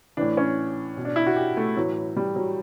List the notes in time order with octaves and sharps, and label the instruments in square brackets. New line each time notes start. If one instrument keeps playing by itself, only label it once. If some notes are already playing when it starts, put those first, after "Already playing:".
[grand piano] A2 E3 D4
C#4
B2
D4
E4
F#4
G4
A3
A2 E3 F#3
G3
F#3